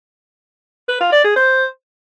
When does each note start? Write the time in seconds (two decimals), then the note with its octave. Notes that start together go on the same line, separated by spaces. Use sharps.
0.88 B4
1.00 F4
1.12 D5
1.24 G#4
1.36 C5